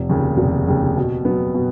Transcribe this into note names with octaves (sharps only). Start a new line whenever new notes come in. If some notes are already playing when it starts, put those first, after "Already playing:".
Already playing: F1
D#2 C#3
F1
D#2 C#3
B2
F#3 B3
B2